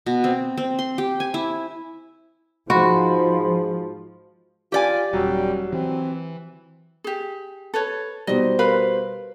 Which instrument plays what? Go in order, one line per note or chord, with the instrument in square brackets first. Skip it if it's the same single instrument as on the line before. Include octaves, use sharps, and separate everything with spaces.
[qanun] B2
C4
C4
C6
G4
G#5
E4
[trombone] G#2 [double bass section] F3 [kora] F#4 [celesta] B5 C6
[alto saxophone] F4 [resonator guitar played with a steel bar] G4 D5 G#5
[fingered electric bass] D#1 [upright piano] F#3 [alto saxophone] G3
[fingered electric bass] E3 [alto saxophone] C4
[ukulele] G4 G#4
A4 B4 C#5
[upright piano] B2 G3 [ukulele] D#4 D#5 [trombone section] C5
[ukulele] A#4 B4 F5